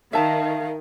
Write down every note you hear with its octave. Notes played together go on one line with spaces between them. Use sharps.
D#3 E5 F5 A5